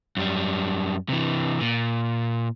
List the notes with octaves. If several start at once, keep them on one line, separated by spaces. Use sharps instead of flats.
F#2 G3
C3 E3
A#2